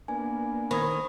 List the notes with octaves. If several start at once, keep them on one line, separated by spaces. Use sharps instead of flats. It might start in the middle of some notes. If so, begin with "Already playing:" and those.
A#3 B3 D4 G#5
D#3 C5 B5 D#6 G#6